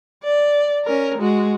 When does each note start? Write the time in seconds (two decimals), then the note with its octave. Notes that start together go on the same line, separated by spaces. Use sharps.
0.24 D5
0.86 C#4 A#4
1.18 G#3 F#4